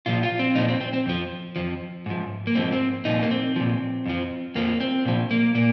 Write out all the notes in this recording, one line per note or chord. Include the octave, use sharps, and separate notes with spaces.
A#2 F3 F4
F4
C4
A#2 F3 D#4
C4
C4
C4
F2 F3
F2 F3
G#2 F3
A#3
G#2 F3 C4
C4
A#2 F3 D#4
A#3
C4
A#2 F3
F2 F3
F2 F3 A#3
C4
A#2 F3
A#3
A#2 A#3